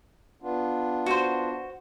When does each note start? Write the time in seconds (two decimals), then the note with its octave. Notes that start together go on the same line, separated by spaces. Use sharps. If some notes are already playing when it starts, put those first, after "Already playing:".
0.42 B3 D4 F4
1.06 F#4 C5